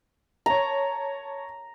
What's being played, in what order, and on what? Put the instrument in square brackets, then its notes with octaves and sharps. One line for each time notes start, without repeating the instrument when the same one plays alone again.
[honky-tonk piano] C#5 A5 [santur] A#5